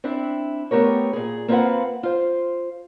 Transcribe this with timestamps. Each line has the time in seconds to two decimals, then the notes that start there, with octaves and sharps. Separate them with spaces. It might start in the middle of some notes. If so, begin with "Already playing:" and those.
0.04 C4 D4 E4 E5
0.71 A3 B3 G4 A#4 C#5
1.13 A#2 G#4
1.48 A#3 C4 E4 F4 B4 F#5
2.03 F4 C5